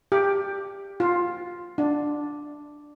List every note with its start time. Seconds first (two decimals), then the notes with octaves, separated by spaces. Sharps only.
0.12 G4
1.00 F4
1.78 D4